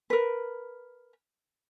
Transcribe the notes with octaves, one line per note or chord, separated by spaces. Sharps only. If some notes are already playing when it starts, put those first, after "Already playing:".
A#4 B4